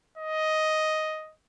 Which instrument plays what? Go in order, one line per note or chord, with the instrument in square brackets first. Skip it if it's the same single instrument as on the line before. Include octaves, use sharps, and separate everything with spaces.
[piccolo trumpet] D#5